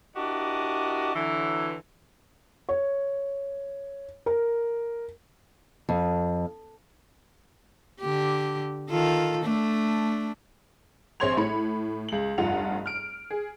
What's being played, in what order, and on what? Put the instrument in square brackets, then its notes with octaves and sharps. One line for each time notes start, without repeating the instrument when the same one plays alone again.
[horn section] D4 E4 F#4 G4 A#4 D#5
D3 E3 F#3
[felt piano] C#5
A#4
[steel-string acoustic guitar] F2
[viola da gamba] D3 G4
D#3 F4 A4
A3 D4
[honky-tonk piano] A#1 C4 C#5 C6 G#6 F7
A2 B5 C#7
C#2 F#7
F1 G2 F4 F#5 F7
F6 D7
G#4